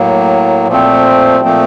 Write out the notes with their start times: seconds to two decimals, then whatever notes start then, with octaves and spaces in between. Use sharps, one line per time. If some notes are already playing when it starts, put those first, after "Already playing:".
Already playing: A2 F#3 A#3
0.68 A#2 F3 A3 C4
1.44 A#2 F3 A3 C4